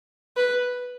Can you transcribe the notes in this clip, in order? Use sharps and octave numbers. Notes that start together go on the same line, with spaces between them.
B4